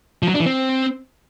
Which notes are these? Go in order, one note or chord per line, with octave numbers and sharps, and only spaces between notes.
F3
F#3
D4
E3
C4